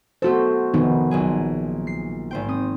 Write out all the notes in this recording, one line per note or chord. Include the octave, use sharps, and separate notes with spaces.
A3 B3 F#4 A4 C5
F1 D#3 B3 D#4
A#1 F#3 G#4
C7
G#1 C5 G5
C4 D#6